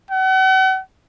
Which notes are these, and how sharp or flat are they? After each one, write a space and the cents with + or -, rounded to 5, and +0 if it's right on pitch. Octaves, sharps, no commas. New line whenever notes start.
F#5 +40